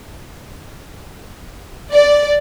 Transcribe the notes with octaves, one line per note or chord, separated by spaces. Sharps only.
D5